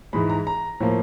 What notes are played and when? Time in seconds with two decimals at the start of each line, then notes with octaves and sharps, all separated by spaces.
0.13 G#2 E3 G#3 B5
0.30 A#5
0.47 A#5
0.80 A2 F3 A#3